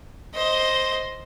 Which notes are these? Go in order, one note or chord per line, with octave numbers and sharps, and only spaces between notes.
C5 D#5